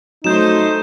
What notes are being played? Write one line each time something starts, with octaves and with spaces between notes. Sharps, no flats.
F#3 A3 D#4 C5 G6 E7